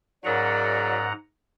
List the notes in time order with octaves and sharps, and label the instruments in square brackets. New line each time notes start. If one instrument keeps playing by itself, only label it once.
[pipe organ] G#2 F#5 A#5 [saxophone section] C#3 F#3 [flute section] A#4 D5